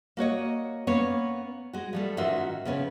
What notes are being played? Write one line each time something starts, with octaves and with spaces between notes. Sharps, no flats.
A#3 F#4 C#5 D#5
A#3 B3 C#4 B4 C#5
G#3 F#4
F3 G3 A3
G#2 D#3 C#4 F4 F#4 E5
C#3 F3 B3 C#4